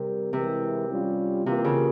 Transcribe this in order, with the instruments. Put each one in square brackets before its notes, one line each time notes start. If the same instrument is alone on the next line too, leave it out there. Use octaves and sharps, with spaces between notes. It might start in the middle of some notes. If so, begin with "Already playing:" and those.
Already playing: [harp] C3 [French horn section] G3 C4 G4 A#4
[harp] C3 [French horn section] E3 G#3 E4 A#4
[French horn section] G3 C#4 F4
[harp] C3 [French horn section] E3 A#3 F4 A#4
[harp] C#3